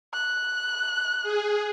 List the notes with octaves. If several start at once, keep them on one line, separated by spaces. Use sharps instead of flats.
F#6
G#4